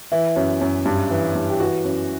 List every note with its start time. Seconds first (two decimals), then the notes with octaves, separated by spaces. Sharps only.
0.12 E3 E4
0.36 F#2
0.61 F#2
0.86 G2
1.10 E3
1.35 G2
1.50 G4
1.60 E3 F#4
1.85 F#2